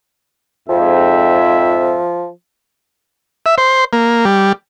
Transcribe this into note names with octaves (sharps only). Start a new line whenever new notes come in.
F2 G#2 F3 E5
E5
C5
A#3
G3